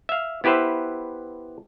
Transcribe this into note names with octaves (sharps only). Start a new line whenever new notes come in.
E5 F5
B3 E4 G4 B4 C5 E5